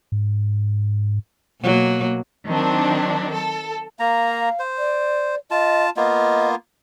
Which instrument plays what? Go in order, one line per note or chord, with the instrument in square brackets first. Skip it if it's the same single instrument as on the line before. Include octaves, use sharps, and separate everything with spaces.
[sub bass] G#2
[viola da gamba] B2 F#3 A#3
[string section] D#3 F#3 C4 D4
A4
[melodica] A#3 A#5 [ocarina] F5
[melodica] C5
[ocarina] D5
[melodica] F4 A5 [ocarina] D#5
[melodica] A#3 B3 F4 [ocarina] D#5